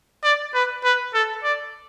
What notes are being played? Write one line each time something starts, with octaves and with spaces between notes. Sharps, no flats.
D5
B4
B4
A4
D5